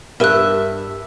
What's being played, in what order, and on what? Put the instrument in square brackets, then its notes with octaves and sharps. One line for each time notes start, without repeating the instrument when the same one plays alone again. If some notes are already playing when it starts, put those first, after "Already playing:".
[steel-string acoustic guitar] G2 E5 [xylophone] A#4 F#6